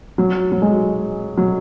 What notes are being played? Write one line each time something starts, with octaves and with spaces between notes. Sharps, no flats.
F#3
F#3
G#3
F#3